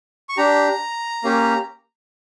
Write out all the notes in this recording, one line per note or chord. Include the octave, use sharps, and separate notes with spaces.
C#6
D4 G4 A#5
A#3 C#4 G4